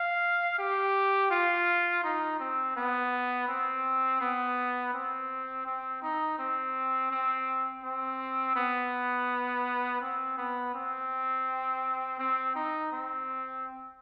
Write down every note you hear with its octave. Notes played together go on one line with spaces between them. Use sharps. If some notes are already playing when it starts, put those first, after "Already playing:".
Already playing: F5
G4
F4
D#4
C4
B3
C4
B3
C4
C4
D#4
C4
C4
C4
B3
C4
B3
C4
C4
D#4
C4